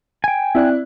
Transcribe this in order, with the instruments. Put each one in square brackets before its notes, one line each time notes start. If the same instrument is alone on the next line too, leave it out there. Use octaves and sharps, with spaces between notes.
[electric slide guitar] G5 G#5
[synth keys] C4 D5 F#6 [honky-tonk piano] E4